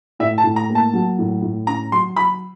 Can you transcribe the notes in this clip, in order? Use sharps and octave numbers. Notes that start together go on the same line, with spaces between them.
A2 E5
A5
A2
A#5
A#3
A5
F#3
A2
A2
C#4 A#5
F#3 C6
F#3 B5